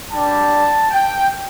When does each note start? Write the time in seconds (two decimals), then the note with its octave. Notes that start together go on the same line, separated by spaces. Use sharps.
0.10 G3 D4 G4 A5
0.90 G5